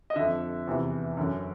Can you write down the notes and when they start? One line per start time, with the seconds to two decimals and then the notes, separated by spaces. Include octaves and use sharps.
0.10 D#5
0.16 F2 D3 E5
0.67 E2 C3 E3
1.17 F#2 D3